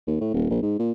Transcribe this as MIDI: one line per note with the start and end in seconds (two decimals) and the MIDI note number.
0.07 0.16 39
0.21 0.33 45
0.34 0.46 27
0.50 0.59 34
0.63 0.78 44
0.79 0.92 46